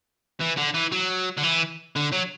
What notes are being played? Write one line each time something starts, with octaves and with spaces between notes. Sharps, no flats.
E3
D3
E3
F#3
D3
E3
D3
F#3